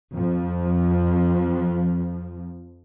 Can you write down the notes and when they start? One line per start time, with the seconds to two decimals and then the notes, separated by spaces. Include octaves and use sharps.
0.15 F2 F3